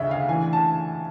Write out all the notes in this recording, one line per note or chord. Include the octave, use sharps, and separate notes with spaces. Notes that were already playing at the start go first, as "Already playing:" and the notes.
Already playing: D2 C#3 D#5 E5
F5
E3 G#5
A5